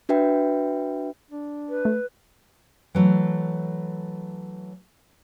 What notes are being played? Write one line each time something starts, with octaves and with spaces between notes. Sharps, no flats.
D4 F#4 B4 E5 G5
D4
B4
A3
E3 F#3 A3